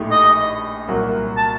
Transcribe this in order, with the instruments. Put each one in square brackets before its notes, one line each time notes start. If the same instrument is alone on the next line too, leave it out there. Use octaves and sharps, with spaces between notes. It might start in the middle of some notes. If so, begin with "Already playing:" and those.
Already playing: [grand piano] A#1 A2 A3 D#4 G4
[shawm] D#5
[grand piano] C2 A#2 F#3 A#3 F#4
[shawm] A5